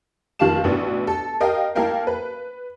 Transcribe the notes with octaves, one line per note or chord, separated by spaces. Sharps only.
F1 D#3 F4 F5 A5 E7
A1 B2 B3 D4 E4
A4
A#4 D#5 F5 G5
A#3 E4 A4 A#4 F5 G5
B4